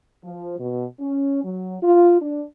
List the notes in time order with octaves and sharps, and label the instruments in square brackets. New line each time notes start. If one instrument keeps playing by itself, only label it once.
[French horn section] F3
B2
C#4
F#3
F4
D4